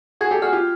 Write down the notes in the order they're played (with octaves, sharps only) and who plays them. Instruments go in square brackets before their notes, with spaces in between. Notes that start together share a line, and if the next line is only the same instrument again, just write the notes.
[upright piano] F#4 G#4 [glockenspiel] G#6
[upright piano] G4 A4
[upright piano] F#4 G#4 [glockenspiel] F6
[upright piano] F4 G4